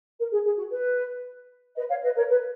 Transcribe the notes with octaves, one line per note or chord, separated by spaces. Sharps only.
A#4
G#4
G#4
F#4
B4
B4 D#5
C#5 F5
B4 D#5
A#4 C#5
B4